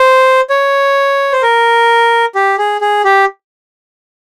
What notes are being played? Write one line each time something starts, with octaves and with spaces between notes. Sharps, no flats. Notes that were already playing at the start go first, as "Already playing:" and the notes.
Already playing: C5
C#5
C5
A#4
G4
G#4
G#4
G4